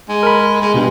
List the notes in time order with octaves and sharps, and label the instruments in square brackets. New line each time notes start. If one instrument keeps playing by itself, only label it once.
[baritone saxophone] G#3
[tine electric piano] A#4 B5
[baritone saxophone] G#3
[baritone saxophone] G2 [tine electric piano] B2